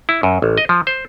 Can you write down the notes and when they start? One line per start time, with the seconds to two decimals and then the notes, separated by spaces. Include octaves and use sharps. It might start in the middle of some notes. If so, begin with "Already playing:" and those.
0.09 E4
0.23 F#2
0.42 A1
0.58 D#5
0.69 F3
0.87 C5